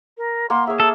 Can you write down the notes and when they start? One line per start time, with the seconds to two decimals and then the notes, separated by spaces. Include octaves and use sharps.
0.18 A#4
0.50 A#3 A#4 F#5 C6
0.67 G#4 C#5 E5
0.80 A4